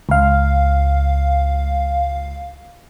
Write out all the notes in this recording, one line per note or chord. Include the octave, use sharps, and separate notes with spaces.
C#2 F5